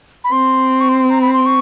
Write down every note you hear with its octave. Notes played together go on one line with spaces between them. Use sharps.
B5
C4 C6
C#6
C6
A#5
B5
C6
C#6